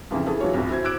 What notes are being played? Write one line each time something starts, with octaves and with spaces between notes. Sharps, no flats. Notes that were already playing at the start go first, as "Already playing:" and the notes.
F2 C#3 E3 F3
E3 G#4 A4
E3 F#3 F4 C#5
G1 C2
E4 F#4 C5 G#6
D6 E6 F#6 G#6 D7